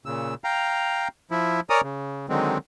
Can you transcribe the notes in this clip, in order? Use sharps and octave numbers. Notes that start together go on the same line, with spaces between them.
A#2 C#3 E6
F5 G5 A#5
F3 E4
A#4 C#5 D5 G#5 A#5 D#6
C#3
D3 D#3 F#3 G#3 C4